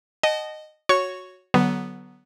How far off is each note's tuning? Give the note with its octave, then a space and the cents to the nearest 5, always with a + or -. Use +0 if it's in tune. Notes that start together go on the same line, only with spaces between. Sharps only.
D#5 -15 F#5 +40 A5 -30
F#4 -10 C#5 +0 C#6 +0
D3 +0 F#3 +25 B3 +0